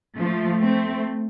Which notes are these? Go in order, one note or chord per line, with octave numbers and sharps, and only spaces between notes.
F3 A3
A3 C4